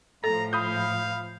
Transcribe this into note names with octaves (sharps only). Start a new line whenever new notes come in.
A2 F3 A4 A#5
F5 B5 D#6 G6